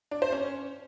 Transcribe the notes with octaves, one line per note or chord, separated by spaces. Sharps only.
D4
C5
C#4